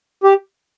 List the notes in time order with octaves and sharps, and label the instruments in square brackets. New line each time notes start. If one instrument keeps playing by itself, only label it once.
[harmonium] G4